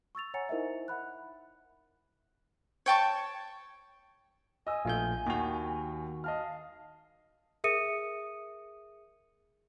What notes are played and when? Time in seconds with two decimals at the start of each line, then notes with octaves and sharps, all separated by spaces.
0.15 C#6 E6 A6 F7
0.34 C#5 F#5 G#5 A#5 A6 C#7
0.49 D#4 E4 A#4 C5 D#5 E5
0.88 E5 F#5 B5 F#6
2.86 C#5 G5 A5 C#6
4.67 D#5 G#5 E6
4.85 A#1 A3 F4 G6
5.26 D#2 D#3 F#4
6.24 D#5 F5 A5 F6
7.64 G#4 A#4 E5 D#6 C#7 D#7